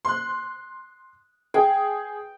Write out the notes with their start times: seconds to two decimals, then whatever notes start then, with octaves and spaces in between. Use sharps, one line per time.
0.05 C6 F#6
1.54 G#4 G5